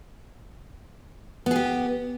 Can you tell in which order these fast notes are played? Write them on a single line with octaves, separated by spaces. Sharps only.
B3 G#4 G4